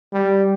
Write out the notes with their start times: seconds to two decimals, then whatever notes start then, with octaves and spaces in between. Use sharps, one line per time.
0.13 G3